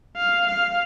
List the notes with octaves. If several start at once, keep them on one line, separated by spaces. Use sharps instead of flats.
F5
F5